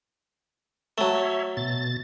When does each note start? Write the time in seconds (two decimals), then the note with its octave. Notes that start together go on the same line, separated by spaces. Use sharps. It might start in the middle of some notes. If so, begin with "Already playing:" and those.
0.98 F#3 A3
1.14 C#5 E5
1.57 B2 A6